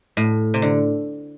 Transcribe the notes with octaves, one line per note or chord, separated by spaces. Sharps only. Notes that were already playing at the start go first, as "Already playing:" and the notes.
A2
C3
D3